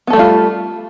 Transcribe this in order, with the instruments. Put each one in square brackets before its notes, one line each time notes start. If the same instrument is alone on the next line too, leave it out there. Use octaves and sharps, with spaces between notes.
[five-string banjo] B3
A4
A3
G3
F4